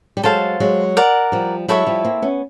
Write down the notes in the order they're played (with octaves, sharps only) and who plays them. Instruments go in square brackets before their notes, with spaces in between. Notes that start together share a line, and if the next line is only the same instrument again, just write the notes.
[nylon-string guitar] G3
[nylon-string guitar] F#3 G#3 [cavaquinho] A4 C5 F5 A5
[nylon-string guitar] F#3 G#3
[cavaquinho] A#4 D5 F#5
[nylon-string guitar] F3 G3
[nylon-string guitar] F#3 G#3 [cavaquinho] E4 A4 C#5 E5
[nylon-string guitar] F3 G3
A#3 C4
B3 C#4